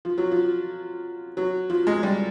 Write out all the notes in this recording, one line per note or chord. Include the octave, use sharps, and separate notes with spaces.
F3
F#3
F3
F#3
F3
G#3
G3